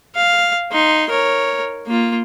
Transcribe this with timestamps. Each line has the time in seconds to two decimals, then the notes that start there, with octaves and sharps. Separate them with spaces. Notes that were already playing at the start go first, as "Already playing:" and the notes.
0.15 F5
0.72 D#4 C6
1.09 A#4 C#5
1.87 A#3 F4